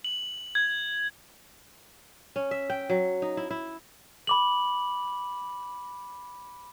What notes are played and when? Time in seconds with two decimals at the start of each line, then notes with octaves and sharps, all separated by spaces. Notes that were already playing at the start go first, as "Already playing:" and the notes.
0.04 F#7
0.55 G#6
2.36 C#4
2.51 E5
2.70 G5
2.89 F#3
3.22 D#4
3.37 E4
3.51 E4
4.27 B5 D6 F#7